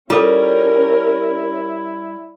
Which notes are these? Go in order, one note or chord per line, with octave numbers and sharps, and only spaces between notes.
G3 C#4 E4 F4 A4 A#4